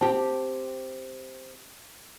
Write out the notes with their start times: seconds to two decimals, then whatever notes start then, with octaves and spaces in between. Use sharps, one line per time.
0.01 C4 G4 A5